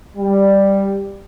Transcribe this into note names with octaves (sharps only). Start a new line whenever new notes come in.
G3